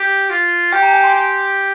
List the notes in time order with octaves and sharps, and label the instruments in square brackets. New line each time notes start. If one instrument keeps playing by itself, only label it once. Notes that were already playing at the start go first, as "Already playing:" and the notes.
Already playing: [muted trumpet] G4
F4
[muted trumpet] G4 [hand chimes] G5
[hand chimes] A#5
G#5
C6
[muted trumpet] G4